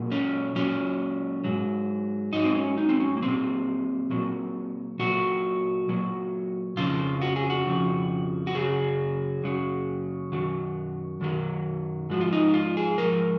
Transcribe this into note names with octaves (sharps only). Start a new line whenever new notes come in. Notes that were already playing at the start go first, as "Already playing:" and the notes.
Already playing: A#2 F#3
C#4
A#2 F#3 C#4
G#2 F#3
G#2 F#3 D#4
C4
C#4
D#4
C4
C#4
A#3
A#2 F#3 C4
A#2 F#3
A#2 F#3 F#4
A#2 F#3
F2 C#3 F3 F4
F#4
G#4
F#4
F2 C#3 F3
F#4
F#2 C#3 F#3 G#4
F#2 C#3 F#3
F#2 D#3 F#3
F#2 D#3 F#3
G#2 F3 F#4
F4
D#4
F4
G#4
G#2 F3 A#4